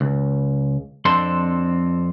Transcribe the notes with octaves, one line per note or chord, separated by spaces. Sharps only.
C#2
F2 C4 D4 A4 C6